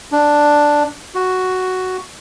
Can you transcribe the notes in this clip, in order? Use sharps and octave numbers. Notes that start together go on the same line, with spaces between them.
D4
F#4